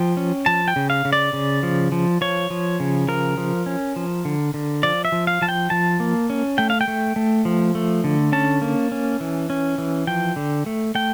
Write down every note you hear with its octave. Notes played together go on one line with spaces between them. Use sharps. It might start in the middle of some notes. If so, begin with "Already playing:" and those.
Already playing: F3 G5
C#4
F3 A5
G5
C#3
F5
C#3
D5
C#3
F3
F3
F3 C#5
F3
C#3
F3 A#4
F3
C#4
F3
D3
D3
F3 D5
E5
F3
F5
F3 A5
G5
F3 A5
A#3
C#4
A3 G5
F5
G5
A3
A3
F3
A3
D3
C#4 A5
A#3
C#4
E3
C#4
E3
F3 G5
D3
A3
A3 G5